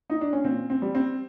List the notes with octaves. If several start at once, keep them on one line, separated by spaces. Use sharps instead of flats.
D#4
D4
C#4
A#2 C4
C4
G3
C4